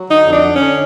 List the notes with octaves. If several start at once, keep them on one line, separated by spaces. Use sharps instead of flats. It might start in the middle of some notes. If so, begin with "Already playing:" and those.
Already playing: F#3
D3 D#4
F2
D4
D3
C#4
D3